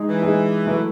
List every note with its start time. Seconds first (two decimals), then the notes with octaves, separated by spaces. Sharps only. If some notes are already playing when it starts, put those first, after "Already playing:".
Already playing: G#3 D#4 G#4
0.08 E3
0.23 G#3 D#4 G#4
0.67 F#3 A3 E4 B4